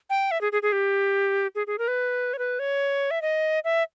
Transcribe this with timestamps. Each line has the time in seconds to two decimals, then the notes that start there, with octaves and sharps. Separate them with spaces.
0.10 G5
0.31 E5
0.41 G#4
0.52 G#4
0.62 G#4
0.72 G4
1.55 G#4
1.67 G#4
1.79 A#4
1.88 B4
2.33 C#5
2.39 B4
2.59 C#5
3.11 E5
3.22 D#5
3.64 E5